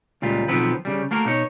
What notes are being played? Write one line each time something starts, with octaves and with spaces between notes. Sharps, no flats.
C#2 A#2 G3 F4
B1 D#3 F3 B3 C4 B4
C#3 G3
A3 A#3 F#4 A#4
B2 D#4 C#5